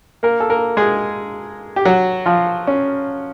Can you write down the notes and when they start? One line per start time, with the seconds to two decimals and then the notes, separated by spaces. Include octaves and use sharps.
0.23 A#3 A#4
0.40 A4
0.50 A#3 A#4
0.77 G#3 G#4
1.76 G4
1.85 F#3 F#4
2.26 F3 F4
2.67 C#4